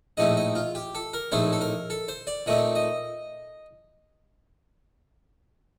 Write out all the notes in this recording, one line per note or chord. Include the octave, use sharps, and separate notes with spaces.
A#1 A2 A3 C4 D#4 D#5
D#5
F4
G4
A4
A#4
A#1 A2 A3 C4 D#4 C5
A4
A#4
A4
C5
D5
A#2 A3 C4 D#4 D#5
D#5